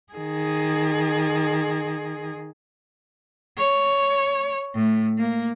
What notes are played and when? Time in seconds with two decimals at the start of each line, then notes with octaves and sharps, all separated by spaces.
0.14 D#3 G#4
3.58 C#5
4.75 A2
5.18 A#3